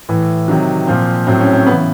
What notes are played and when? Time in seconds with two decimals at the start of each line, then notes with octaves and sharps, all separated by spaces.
0.08 A2 E3
0.48 C3 D#3 F#3
0.87 A#2 F3 C4
1.27 A2 F#3 C4
1.41 C#4
1.53 C4
1.66 C#3 E3 B3